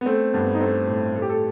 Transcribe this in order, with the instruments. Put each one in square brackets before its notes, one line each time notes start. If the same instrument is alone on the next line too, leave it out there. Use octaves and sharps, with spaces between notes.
[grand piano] B3
A3 C4
G2 B3
D#4
A3 C4
A2
A3 A4
G4
A4